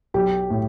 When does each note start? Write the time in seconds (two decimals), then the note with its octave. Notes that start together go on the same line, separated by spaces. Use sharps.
0.14 B1 G4
0.50 A2